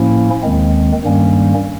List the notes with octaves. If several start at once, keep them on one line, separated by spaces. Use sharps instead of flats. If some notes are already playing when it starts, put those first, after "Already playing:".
Already playing: A2 F3 A#3 C#4 E4
D#2 D#3 G#3 C4
G2 D#3 G3 A#3 C#4